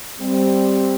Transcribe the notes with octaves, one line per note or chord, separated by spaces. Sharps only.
G3 C4